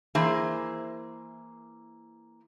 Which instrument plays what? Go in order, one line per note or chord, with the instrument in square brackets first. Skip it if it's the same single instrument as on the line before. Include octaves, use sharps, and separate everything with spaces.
[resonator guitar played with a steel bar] E3 A#3 G#4 C5 E5